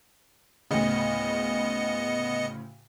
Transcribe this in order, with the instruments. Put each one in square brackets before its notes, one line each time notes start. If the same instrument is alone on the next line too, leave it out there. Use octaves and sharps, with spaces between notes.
[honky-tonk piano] D2 A2 C#3 [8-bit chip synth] B3 D#5 C#7